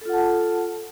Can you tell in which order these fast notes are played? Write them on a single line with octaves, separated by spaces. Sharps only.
A4 F4 F#5 A5